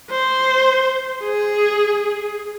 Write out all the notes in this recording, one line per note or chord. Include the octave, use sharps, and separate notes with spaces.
C5
G#4